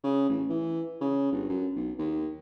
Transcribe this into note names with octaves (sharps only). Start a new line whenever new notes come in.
C#3
A1
E3
C#3
G1
F#2
B1
D#2